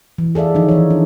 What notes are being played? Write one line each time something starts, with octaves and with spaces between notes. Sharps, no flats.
E3
G#4 A4 D5 E5 F5
D#3 F3 D#4
E3 C#5
D4